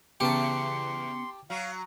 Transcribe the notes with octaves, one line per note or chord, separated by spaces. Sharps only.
E2 C#3 B3 G4 A5 C6 C#7
F#3 F#4 F5